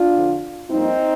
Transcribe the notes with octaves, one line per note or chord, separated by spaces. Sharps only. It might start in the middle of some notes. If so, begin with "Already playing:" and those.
Already playing: D4 F4
F2 D3 F3
G2 F3 A#3 C4 D#4